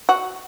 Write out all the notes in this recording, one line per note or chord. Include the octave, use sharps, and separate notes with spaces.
F#4